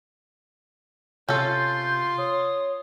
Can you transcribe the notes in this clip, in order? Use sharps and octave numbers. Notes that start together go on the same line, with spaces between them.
C3 C#4 F4 A4 C6 G6
C#5 D#6